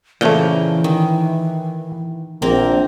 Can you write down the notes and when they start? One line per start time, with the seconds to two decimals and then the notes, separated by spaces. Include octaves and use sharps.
0.21 A#2 C#3 E3 F3 A3 A#3 G5
0.84 D#3
2.42 A#1 A#3 C4 A#4